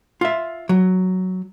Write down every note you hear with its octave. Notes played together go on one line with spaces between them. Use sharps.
F4 E5
F#3